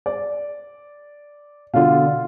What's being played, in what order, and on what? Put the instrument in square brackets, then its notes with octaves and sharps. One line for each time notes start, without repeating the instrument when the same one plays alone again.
[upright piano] D5
[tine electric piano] B2 D3 [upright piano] F4 F5